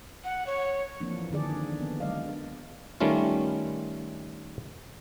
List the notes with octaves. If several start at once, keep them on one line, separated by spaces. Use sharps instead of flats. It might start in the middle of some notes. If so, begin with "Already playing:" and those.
F#5
C#5
E3 F3 A#3 C4 D4
D3 D#3 D4 G#4 D5
B3
F#3 G#3 D5 D#5 F5
D#3 G3 A3 C#4 F4